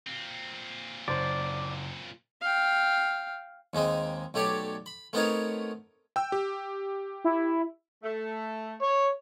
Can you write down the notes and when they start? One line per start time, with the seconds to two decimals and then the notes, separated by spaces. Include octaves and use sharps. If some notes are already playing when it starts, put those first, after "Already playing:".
0.07 A#2 C4
1.08 F#1 C5 D5 C6
2.41 F5 G5
3.73 D#2 G#3 C4 D#4
4.34 B1 A3 G4 C#5 D5
4.86 B5
5.13 A3 B3 C4 D#4 A#4 C#5
6.16 G5 E6
6.32 G4
7.24 E4
8.03 A3
8.83 C#5